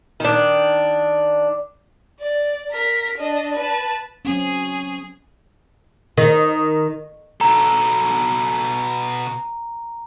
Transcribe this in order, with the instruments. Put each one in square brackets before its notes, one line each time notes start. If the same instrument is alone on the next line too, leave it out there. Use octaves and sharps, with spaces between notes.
[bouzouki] D#3 D4
[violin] D5
A#4 B6
D4 D#5
B4 A5
[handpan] F#3 C4 C#4 [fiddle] G#4
[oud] D#3
[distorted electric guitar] B2 A4 [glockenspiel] A#5